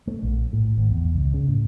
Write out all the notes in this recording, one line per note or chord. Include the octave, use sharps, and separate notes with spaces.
A3
A#1
A2
G#1
E2
C#2
C#3
A2